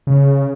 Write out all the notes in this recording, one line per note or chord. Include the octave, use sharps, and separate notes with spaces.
C#3